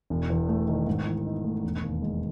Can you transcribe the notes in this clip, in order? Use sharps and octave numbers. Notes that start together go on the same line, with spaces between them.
E1
E2
A3
D#3
G#2
E3
D#4
A3
E1
D#2
G#3